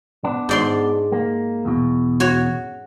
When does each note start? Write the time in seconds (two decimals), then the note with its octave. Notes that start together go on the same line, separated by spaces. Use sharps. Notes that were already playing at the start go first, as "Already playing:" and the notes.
0.24 B3 D4
0.49 G#2 D5 C6
1.12 A#3
1.65 E2 B2
2.20 F#4 C#5